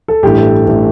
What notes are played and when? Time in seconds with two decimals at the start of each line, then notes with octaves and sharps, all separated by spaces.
0.08 A4
0.23 A1 G2 E3 A3 G4
0.38 A4
0.67 A1 E3 A3